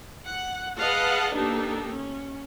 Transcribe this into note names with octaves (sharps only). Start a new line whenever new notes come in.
F#5
G#4 B4 D#5 F5 F#5 A5
A#3 B3 D4 D#4 G4 A4
C#4